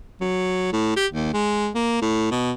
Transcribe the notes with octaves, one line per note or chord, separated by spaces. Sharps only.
F#3
A2
G4
D#2
G#3
A#3
A2
B2